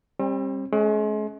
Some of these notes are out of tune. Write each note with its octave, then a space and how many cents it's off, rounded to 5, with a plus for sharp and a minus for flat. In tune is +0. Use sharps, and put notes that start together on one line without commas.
G3 +20 C4 +45
G#3 +40 C#4 -10